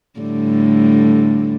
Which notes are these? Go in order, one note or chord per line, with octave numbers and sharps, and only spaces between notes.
A2 D3 G3